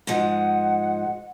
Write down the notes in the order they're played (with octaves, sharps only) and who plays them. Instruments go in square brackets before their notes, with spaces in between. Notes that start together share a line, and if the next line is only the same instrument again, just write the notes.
[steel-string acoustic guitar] G#2 F3 G#3 [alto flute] F#5